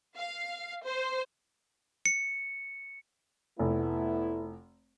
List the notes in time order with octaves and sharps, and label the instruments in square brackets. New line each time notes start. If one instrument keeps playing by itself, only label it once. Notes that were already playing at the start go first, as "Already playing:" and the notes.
[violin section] F5
C5
[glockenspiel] C#7
[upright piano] F1 [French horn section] A3 B3 E4